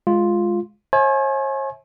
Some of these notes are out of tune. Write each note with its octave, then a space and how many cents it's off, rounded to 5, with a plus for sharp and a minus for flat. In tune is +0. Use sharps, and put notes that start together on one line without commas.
G#3 +0 F4 +0
C#5 -45 E5 -25 G#5 +30